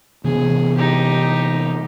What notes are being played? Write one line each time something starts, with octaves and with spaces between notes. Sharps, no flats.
C3 E3 B3 G#4
D#4 G4